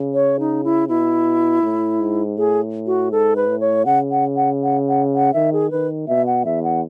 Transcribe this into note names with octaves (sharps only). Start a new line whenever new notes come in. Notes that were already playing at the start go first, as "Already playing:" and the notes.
Already playing: C#3
C#5
D#4
E4
B2 E4
A2
G#2
A2 G#4
F#4
G#2 A4
B4
A2
C#5
C#3 F#5
F#5
F#5
F#5
F#5
F#5
D#3 E5
G#4
D#3 B4
B2 E5
F#5
E2 E5
F#5